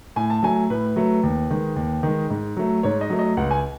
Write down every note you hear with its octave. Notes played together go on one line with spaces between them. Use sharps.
A2 G#5
A5
F#3 A3 G#5
A2 B4
F#3 A3
D#2
D#3 G#3
D#2
D#3 G#3
G#2
F#3 A3
G#2 C#5
D#5
F#3 A3
D#5
C#2 F#5
G#5